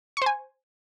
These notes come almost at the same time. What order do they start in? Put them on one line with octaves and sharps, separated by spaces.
C#6 C5 G#5